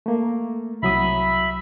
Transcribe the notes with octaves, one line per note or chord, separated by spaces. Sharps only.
A3 A#3
C2 F#3 E5 B5 D#6